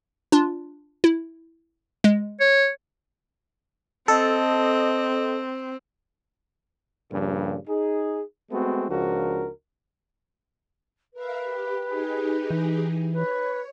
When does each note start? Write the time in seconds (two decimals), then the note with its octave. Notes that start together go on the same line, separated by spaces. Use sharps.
0.32 D4 F4
1.04 E4
2.04 G#3
2.40 C#5
4.08 C4 A4 D#5
7.12 G2 A#2 C#3 F3 G3
7.68 D#4 G#4
8.51 G#3 A3 B3 C4 F#4
8.88 C#2 F3 D4 F#4 A#4
11.14 A#4 B4 E5 F5
11.44 G4
11.85 D#4 G4 G#4
12.50 E3
13.13 B4 C#5